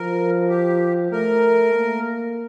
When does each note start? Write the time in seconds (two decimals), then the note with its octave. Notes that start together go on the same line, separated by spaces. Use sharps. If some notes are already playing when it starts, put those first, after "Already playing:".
Already playing: F3 A#4
0.49 G4
1.12 A3 A#4
1.75 A#3